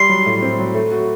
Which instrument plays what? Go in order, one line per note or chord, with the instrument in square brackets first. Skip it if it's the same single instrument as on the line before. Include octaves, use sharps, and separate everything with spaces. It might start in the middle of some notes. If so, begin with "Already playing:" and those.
Already playing: [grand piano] G3 [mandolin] C6
[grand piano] F#3
A2
C4
F#3
A3
F#4